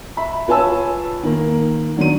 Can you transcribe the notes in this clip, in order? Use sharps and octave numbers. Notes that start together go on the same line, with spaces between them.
E5 B5
F4 B4 C#5 G#5 A5 E6
D#3 A#3
D#3 F#3 D4 D#7